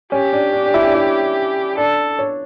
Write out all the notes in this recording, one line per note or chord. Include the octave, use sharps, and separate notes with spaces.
C#4 G4
D4
D4
D4
E4
D4
E4
D4 A4
C#5